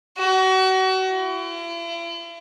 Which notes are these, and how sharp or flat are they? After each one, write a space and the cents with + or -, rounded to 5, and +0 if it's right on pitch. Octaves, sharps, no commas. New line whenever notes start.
F#4 +35
E4 +45